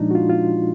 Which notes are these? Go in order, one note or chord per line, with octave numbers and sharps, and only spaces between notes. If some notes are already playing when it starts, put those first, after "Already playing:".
Already playing: A#2 F3 G#3 D4 D#4
F#4
F4
F4